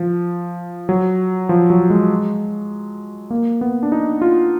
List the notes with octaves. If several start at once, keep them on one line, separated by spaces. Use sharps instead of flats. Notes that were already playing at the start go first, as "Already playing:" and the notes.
Already playing: F3
F#3
F3
F#3
G#3
A#3
B3
D4
D#4
F4